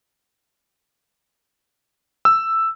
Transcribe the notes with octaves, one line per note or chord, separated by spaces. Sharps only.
E6